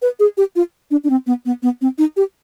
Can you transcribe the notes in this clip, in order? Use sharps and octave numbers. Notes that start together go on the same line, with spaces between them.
B4
G#4
G4
F4
D4
D4
C4
B3
B3
B3
C4
D#4
G4